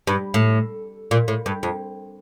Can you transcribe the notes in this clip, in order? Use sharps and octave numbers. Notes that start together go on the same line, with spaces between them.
G2
A2
A#2
A2
G2
F2